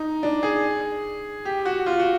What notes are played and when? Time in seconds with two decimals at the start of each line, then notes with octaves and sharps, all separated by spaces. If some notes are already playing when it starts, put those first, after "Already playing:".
Already playing: D#4
0.23 D4
0.43 G#4
1.45 G4
1.65 F#4
1.86 F4
1.99 F#4